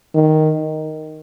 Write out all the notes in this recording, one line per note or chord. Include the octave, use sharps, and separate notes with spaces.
D#3